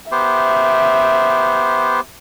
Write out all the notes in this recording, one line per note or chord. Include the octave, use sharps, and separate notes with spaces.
B3 G4 C5 E5